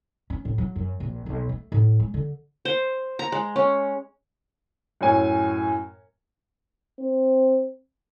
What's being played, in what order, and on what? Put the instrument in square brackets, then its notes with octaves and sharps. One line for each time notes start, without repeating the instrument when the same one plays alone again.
[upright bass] C#4
A2
F#3
F#2
A#1
B1
A3
A2
G#3
D3
[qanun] C5
A#5
G#3
C#4
[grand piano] F#2 A2 C#5 G#5
[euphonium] C4